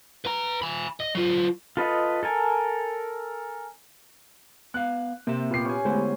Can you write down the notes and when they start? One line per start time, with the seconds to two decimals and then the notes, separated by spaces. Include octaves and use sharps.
0.25 B4 A#5
0.62 G#5 B5
1.00 D#5
1.15 F#3 F4
1.77 F4 A4 B4 D#5
2.23 A4 A#4 G#5
4.74 B3 F5 F#6
5.27 C3 A#3 C4 E5
5.50 A#2 B3 G4 B4 C7
5.65 C#4 G#5
5.85 D3 G#3 A3 B3 E4 G4 C5